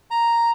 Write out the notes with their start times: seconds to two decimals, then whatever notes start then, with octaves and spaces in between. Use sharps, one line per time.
0.11 A#5